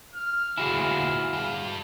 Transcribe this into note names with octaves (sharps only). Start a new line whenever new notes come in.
F6
D2 A#2 E4 F#4 G#4 F5
G2 G3